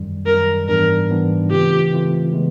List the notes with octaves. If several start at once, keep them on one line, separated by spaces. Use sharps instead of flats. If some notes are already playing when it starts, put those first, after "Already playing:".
Already playing: F#2 D#3 G3
F#2 D#3 G3 A#4
G#2 E3 G3 B3 D4 A#4
G#2 E3 G3 B3 D4
C#3 E3 A3 C4 F4 G4
C#3 E3 A3 C4 F4
C#3 E3 G#3 B3